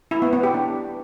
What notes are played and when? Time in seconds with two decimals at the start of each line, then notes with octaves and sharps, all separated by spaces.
0.11 E4
0.22 B3
0.33 B3
0.43 G4
0.54 D4